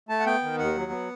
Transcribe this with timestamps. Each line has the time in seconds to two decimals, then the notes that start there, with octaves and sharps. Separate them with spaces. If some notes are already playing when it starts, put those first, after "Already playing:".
0.09 A3 A5
0.20 F#5
0.26 B3 G5
0.43 D#3
0.58 D#2 F#5
0.75 F#3
0.91 B3